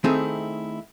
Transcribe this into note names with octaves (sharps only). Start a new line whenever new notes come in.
D#3 A3 C4 D#4 E4 G#4